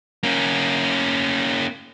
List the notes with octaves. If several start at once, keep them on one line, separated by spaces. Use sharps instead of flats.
A#3 C#4